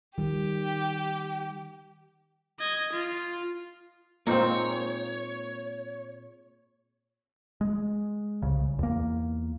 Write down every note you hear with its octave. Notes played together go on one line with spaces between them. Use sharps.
D#3 G3 G4
D#5 G#6
F4
A#2 G#3 A#3 C4 D#4 C5 C#5
G#3
C2 C#3
E2 A#3